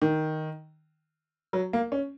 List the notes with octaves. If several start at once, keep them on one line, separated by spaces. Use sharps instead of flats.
D#3
F#3
A#3
C#4